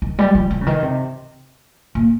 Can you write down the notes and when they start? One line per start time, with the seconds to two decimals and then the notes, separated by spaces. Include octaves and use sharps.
0.02 D#3
0.19 G3
0.35 F3
0.51 F3
0.61 C#3
0.67 D#3
0.83 C3
1.95 A#2